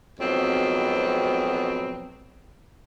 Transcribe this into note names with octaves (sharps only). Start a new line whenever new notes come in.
F2 G#2 B2 F#3 B3 C4